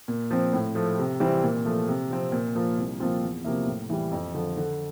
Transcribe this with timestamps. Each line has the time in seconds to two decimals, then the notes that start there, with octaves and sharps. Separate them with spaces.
0.08 A#2
0.31 F3 C4
0.53 A2
0.75 F3 A3
0.98 C3
1.20 E3 G3 C4
1.43 A#2
1.65 F3 A3
1.88 C3
2.11 F3 C4
2.32 A#2
2.55 F3 A#3 F4 A#4
2.78 C2
3.00 A#2 F3 C4 F4
3.23 E2
3.44 C3 F3 A#3 E4
3.67 A2
3.90 E3 G3
4.11 F2
4.34 D3 F3
4.57 D3